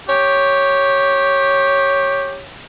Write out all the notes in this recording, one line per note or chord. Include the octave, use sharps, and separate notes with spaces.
G4 C#5